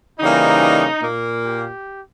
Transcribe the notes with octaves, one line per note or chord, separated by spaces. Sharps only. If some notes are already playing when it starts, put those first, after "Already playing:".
C#3 E3 G3 A#3 D#4
A#2 A#3
G4